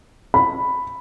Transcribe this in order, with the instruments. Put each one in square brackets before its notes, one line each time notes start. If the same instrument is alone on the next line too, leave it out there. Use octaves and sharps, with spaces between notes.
[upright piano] B5